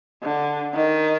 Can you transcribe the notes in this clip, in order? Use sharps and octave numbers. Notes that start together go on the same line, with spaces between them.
D3
D#3